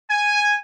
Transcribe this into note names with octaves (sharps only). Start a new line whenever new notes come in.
G#5